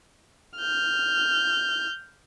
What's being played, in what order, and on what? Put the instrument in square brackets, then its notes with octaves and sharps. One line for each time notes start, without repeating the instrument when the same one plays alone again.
[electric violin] F6 G6